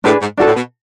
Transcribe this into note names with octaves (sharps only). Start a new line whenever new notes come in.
A2 D4 G#4 B4
G#2
G#2 D4 F#4 A4
A2
B2